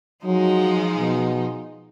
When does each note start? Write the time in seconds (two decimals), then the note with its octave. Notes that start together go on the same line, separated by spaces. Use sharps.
0.25 F3 F#3 G#3 D#4
0.97 B2